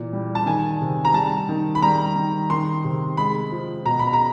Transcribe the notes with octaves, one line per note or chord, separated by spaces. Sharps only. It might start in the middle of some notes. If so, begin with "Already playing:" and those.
Already playing: A#2 E3
G3
A5
D#3 G#5
C3
A#5
G3 A5
D#3
B5
G3 A#5
D#3
D#3 C6
C3
G#3 B5
F3
B2 A#5
B5
A#5